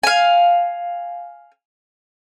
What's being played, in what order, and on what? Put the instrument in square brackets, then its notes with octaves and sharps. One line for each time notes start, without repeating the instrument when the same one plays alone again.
[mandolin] F5 G#5